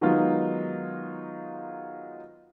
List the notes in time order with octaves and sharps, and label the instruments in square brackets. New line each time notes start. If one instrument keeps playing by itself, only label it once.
[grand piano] D#3 F#3 G#3 B3 D#4 F4